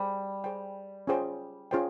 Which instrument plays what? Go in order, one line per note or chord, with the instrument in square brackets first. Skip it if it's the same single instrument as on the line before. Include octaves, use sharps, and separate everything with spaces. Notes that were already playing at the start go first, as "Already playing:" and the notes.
Already playing: [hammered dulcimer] G3 [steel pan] G#4 C5 G5
[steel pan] G#4 C5 G5
C#4 F4 G#4 C5 G5
C#4 F4 G#4 C5 G5